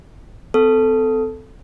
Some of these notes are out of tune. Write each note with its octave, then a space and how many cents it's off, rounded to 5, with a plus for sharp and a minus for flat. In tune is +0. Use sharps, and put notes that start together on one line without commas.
C4 -40 A4 +0